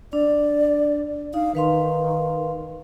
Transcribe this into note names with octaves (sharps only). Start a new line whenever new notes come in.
D4 D5
D#4 F5
D#3 B4 F5 C6